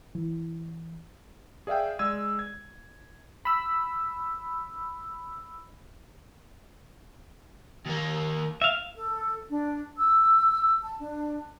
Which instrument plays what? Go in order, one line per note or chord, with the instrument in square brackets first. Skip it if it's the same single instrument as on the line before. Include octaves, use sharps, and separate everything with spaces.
[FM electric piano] E3
[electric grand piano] G#4 D5 E5 F5 G5
G#3 D5 E6 G#6 D#7
G#6
[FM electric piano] B5 E6
[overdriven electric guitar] D#2 A#3
[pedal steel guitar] E5 F5
[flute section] A4
D4
E6
A5
D4